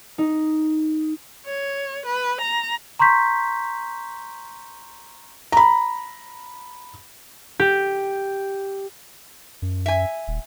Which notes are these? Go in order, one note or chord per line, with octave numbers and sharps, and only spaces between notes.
D#4
C#5
B4
A#5
A#5 C6 C#6 G6 B6
A#5 B5
G4
F#2
E5 G#5
D#1